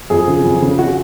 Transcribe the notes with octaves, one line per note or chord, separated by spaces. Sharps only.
F2 G#4
C#3
F2
C#3
F#4